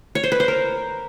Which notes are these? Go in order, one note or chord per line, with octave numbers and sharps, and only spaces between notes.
C#5
C5
B4
C5
A#4